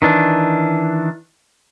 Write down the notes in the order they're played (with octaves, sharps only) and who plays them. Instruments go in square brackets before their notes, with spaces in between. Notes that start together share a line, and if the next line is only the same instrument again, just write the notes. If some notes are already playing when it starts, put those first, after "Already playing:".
[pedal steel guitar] D#3 E3 D4